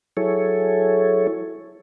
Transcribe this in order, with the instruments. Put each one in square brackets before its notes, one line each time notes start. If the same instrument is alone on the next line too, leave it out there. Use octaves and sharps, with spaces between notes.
[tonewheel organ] F#3 E4 G#4 A4 C#5